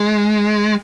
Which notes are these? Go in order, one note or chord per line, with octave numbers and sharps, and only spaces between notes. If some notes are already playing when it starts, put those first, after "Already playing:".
Already playing: G#3